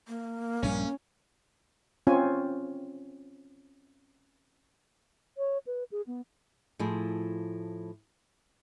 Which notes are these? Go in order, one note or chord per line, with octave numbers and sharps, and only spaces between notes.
A#3
A#1 G2 G3 C#4
C4 C#4 F4 C#5 G#5
C#5
B4
G#4
B3
A2 F3 E4 F4 G#4